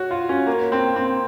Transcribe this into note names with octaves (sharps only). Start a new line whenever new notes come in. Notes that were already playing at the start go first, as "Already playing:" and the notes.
Already playing: F#4 C#5
F4
C#4
A#3
C4
C4